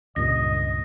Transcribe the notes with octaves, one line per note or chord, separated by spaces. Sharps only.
C#2 G2 A#2 D#5 A#6